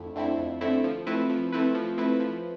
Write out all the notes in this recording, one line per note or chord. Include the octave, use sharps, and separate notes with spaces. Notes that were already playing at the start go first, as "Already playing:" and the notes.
Already playing: F2 D3 A3 E4
D3 A3 C4 E4
F2
D3 A3 C4 E4
F3
A3 C4 E4 B4
F3
A3 C4 E4 B4
F3
A3 C4 E4 B4
F3